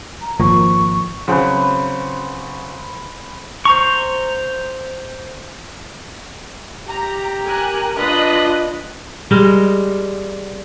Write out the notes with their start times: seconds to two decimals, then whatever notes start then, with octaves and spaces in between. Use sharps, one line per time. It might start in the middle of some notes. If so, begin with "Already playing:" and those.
0.22 A#5
0.40 G#1 F3 A#3 C#6
1.28 C#3 F#3 C4 B4 C5
3.65 C5 A#5 C#6
6.88 G4 A#5
7.45 A#4 G#5 F#6
7.97 D4 F4 B4 D#5 F#6
9.31 G3 G#3 A#4